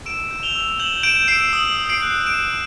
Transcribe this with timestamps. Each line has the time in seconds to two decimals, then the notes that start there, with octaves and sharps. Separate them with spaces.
0.05 E6 D7 E7
0.31 G6
0.43 F7 G7
0.55 E6
0.80 G6 E7 F#7
1.03 G6 D7 E7
1.28 E6 C7 D7
1.53 D#6
1.77 D#6
1.89 C7 D7
2.02 F#6
2.26 D#6 D7 E7